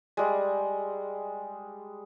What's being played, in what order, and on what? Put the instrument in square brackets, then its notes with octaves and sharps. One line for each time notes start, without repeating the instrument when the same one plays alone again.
[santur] G3 G#3